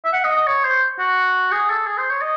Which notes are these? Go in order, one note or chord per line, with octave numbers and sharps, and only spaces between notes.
E5
F#5
D#5
D#5
C#5
C5
F#4
G#4
A4
G#4
C5
C#5
D#5